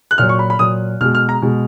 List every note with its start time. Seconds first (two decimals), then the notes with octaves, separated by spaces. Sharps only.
0.11 F#6
0.18 A#2 F#3 F6
0.29 C#6
0.39 B5
0.50 B5
0.59 A#2 F#3 D#6
1.01 B2 F6
1.04 G#3
1.15 F6
1.29 A#5
1.42 B2 G#3